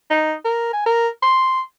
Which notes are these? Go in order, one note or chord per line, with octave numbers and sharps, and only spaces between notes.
D#4
A#4
G#5
A#4
C6